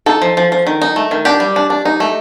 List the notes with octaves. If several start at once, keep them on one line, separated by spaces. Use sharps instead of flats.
D#4 A4
F3
F3
F3
D#3
D#4
A3
D#3
D4 G4
G3
D4
D4
D#4
A3